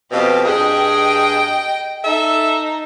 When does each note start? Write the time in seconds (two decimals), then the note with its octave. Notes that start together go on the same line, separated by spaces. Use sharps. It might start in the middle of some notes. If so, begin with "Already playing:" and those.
0.11 F2 B2 F4 G4
0.45 G2 G#4 D#5 G5
2.04 D#4 A4 E5